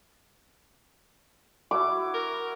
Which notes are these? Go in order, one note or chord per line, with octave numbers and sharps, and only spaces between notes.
E4 F#4 D6
A#4